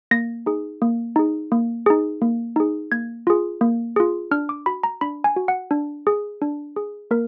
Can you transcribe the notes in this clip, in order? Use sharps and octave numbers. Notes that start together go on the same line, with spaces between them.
A#3 A#6
D#4 G#4
A#3
D#4 G#4
A#3
D#4 G#4
A#3
D#4 G#4
A#3 G#6
F4 G#4
A#3
F4 G#4
D4 F6
D6
F#4 B5
A#5
D4 B5
G#5
F#4
F#5
D4
G#4
D4
G#4
A#3 A#4